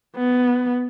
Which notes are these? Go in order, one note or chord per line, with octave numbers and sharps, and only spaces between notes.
B3